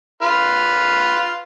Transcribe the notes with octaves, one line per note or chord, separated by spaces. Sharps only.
F4 B4 F6